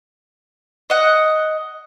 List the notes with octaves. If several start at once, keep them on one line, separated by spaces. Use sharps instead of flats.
D#5 F#5